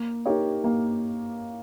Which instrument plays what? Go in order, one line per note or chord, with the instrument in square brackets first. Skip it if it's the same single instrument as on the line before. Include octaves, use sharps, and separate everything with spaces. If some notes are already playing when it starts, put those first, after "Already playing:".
Already playing: [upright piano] A#3
D#4 G4 A#4 C#5
A#3